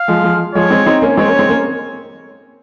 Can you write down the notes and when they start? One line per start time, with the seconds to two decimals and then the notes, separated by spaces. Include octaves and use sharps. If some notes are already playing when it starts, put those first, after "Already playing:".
Already playing: F5
0.08 F3 G#3
0.24 F3 G#3
0.55 F3 G#3 C#5
0.71 G#3 C4
0.86 C4 D#4
1.02 A#3 C#4
1.17 G#3 C4 C#5
1.28 A#3 C#4
1.39 G#3 C4
1.49 A#3 C#4